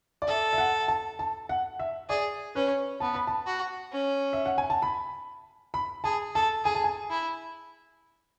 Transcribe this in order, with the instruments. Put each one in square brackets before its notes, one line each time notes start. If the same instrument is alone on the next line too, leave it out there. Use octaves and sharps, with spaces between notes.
[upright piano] D5
[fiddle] A4 [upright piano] E5
[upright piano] E5
F#5
A5
A5
F#5
E5
[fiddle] G#4 [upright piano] D5
[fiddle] C#4 [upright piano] B4
[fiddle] B3 [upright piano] A5
[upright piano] B5
A5
[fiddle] F#4
C#4
[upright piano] E5
F#5
G#5
A5
B5
B5
[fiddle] G#4 [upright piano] A5
[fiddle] A4 [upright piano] A5
[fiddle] G#4 [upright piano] G#5
[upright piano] A5
G#5
[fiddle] E4